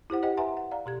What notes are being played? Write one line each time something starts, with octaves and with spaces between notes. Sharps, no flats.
E4 G4 C5 F#5
G4 C5 D#5 F#5 G5
B4 E5 F#5 G#5 A#5 C6
F#5
D5 F5 A#5
B2 G4 G#6